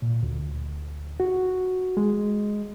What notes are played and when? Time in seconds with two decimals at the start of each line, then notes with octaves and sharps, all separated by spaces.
0.02 A#2
0.23 D2
1.20 F#4
1.97 G#3